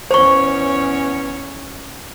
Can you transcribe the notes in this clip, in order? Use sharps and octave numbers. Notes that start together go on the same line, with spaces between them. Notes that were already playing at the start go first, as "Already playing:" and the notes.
E2 C#4 C5 C#5 C#6